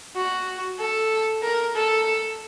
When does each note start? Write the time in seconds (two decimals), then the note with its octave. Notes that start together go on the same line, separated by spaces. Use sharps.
0.15 F#4
0.79 A4
1.42 A#4
1.75 A4